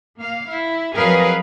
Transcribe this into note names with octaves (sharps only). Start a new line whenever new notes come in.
A#3 F5
E4
F2 F#3 G#4 A#4 B4 F5